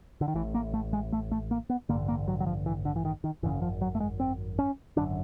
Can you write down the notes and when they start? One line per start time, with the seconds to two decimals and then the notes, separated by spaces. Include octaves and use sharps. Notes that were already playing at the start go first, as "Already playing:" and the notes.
0.21 D3
0.28 D#3
0.35 A1 A2 E3
0.54 A#3
0.74 A3
0.93 G#3
1.12 A3
1.32 A3
1.51 A#3
1.70 B3
1.89 A1 G2 D3 A#3
2.08 A#3
2.28 F#3
2.40 F#3
2.46 F3
2.66 E3
2.85 D3
2.96 E3
3.05 D#3
3.24 D#3
3.43 G#1 F#2 C#3 E3
3.62 F3
3.81 F#3
3.95 A3
4.00 G#3
4.20 C4
4.59 C#4
4.96 G#1 F#2 D3 D4